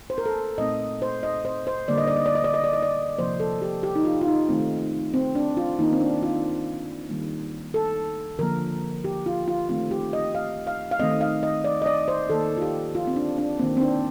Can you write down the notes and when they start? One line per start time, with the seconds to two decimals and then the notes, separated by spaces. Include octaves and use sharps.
0.10 C5
0.18 A#4
0.26 A4
0.58 A#2 A3 C4 D#5
1.02 C5
1.23 D#5
1.45 C5
1.67 C5
1.88 D3 G3 A#3 D5
1.98 D#5
2.07 D5
2.16 D#5
2.26 D5
2.35 D#5
2.44 D5
2.54 D#5
2.64 D5
2.73 D#5
2.82 D5
3.18 C3 F3 A#3 C5
3.40 A4
3.62 G4
3.83 G4
3.95 D#4
4.05 F4
4.21 F4
4.27 D#4
4.49 D#3 A3 C4
5.14 C4
5.35 D4
5.57 F4
5.79 D#3 A#3 D#4
5.92 C4
6.01 D4
6.22 F4
7.09 D#3 G3 A#3
7.74 A4
8.39 D3 F3 A#3 A#4
9.04 G4
9.26 F4
9.48 F4
9.69 D#3 A3 C4 F4
9.91 G4
10.13 D#5
10.35 F5
10.67 F5
10.91 F5
11.00 D#3 A3 C4 D#5
11.21 F5
11.43 D#5
11.64 D5
11.82 D#5
11.86 D5
12.08 C5
12.30 D#3 A#3 A4
12.57 F4
12.62 G4
12.95 F4
13.07 C4
13.16 D4
13.38 D4
13.59 D#3 A#3 C4
13.77 C4
13.82 D4